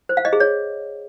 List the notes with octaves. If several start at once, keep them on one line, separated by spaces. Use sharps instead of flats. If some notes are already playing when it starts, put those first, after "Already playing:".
C5
F5
D#5
G#4
C#5